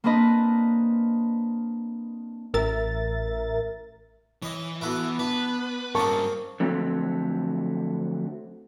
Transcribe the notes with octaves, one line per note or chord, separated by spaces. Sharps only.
A#3 C4 D4 B4 D#5
A1 A#4 E5 A6
E3 C#5 D#5
B3 E4 F#4 A4
D4 B4
G2 A#3 C4 C#4 G#4 A#4 A5 C#6
D3 F3 F#3 A3 C4